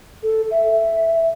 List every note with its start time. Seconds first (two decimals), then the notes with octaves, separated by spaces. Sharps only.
0.23 A4
0.51 E5